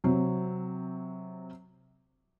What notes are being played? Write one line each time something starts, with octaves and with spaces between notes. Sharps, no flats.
C3 F#3 C4